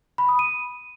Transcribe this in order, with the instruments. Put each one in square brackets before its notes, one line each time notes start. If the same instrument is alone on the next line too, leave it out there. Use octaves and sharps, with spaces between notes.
[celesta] B5
D#6
D#7